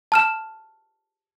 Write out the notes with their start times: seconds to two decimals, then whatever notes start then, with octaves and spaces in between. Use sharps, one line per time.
0.12 A5 F6 E7